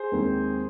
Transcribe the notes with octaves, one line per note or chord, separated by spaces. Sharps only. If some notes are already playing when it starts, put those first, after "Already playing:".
Already playing: G#4 C5
D#2 D#3 G#3 C4